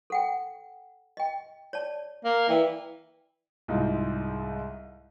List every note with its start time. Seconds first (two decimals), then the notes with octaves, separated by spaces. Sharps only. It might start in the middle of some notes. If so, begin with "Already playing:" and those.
0.10 A4 F#5 G5
1.17 D#5 G5
1.73 C#5 D5 A5
2.24 A#3
2.49 E3 D5 G5
3.68 C2 G#2 D#4 F4